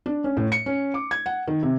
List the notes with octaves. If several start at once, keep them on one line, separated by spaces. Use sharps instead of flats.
D4
C#4
A2
C#7
C#4
D6
G#6
F#5
D#3
C3